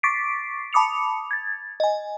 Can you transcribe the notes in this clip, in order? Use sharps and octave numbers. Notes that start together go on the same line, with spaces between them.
C#6 D6 A6 B6 C7 D7
A5 B5 D6 D#6 C#7 F7
G#6 A6
D#5 G#5